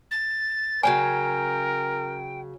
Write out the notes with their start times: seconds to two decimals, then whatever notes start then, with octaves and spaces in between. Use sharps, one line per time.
0.11 A6
0.83 C#3 F#3 C#4 A#4 G5 G#5